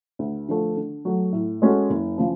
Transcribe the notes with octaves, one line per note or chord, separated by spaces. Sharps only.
D2
D3 F3 A3
D3
F#3 A3
A2
G#3 C#4 F#4 A4
F#1
C#3 F3